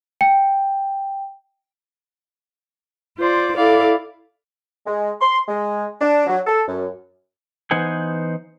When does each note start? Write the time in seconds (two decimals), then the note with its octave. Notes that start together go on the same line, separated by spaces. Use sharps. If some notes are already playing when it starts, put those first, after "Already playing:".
0.21 G5
3.18 F4 C5 D5
3.54 E4 A4 D5 F5
4.87 G#3
5.21 C6
5.48 G#3
6.01 D4
6.27 F#3
6.47 A4
6.68 F#2
7.71 E3 B3 D#4 C5 F#5 G#5